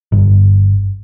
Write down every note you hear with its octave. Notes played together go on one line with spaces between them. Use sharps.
G1